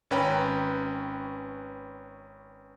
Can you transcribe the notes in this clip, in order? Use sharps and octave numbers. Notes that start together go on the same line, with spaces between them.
G#1 C#4 B4 G5 A#5